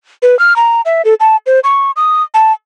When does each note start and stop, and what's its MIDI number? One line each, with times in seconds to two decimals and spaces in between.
0.22 0.38 71
0.39 0.56 89
0.56 0.81 82
0.85 1.02 76
1.05 1.14 69
1.20 1.36 81
1.46 1.60 72
1.64 1.91 85
1.96 2.22 87
2.34 2.52 81